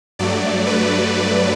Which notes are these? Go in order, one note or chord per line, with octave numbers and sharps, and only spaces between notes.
G2 F#3 A3 D5
B4